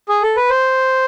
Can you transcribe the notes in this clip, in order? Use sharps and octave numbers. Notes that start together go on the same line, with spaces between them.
G#4
A4
B4
C5